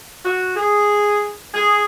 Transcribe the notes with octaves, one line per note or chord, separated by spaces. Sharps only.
F#4
G#4
G#4